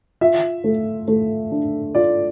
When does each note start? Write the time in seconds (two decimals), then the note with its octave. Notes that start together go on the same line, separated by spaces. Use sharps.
0.21 F4 E5
0.64 A3
1.08 A3
1.52 D4
1.95 F4 D5